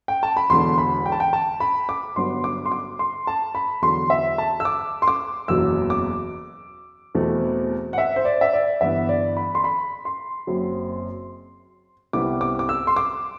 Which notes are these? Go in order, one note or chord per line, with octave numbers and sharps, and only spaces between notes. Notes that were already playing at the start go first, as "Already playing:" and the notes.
G5
A5
B5
E1 E2 D3 C6
B5
G5
A5
G5
A5
B5
D6
G1 G2 F#3 B3 C6
D6
C6
D6
C6
A5
B5
E2 D3 F#3 C6
E5
A5
E6
D6
C6
D6
F#1 E2 B2 F#3 E6
D6
E2 B2 A3 C4
F#5
E5
C5
D5
E5
D5
G1 G2 E3 B3 E5
D5
B5
C6
B5
C6
F#1 F#2 F#3 C4
C2 C3 G3 B3 E4 D6
D6
D6
E6
C6
D6